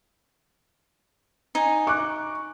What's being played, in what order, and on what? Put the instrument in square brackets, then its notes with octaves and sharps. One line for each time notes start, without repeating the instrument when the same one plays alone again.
[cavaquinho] D#4 G#5
[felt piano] C#6 D6 F#6